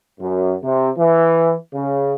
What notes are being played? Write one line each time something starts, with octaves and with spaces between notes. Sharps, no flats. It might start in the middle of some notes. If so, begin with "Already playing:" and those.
F#2
C3
E3
C#3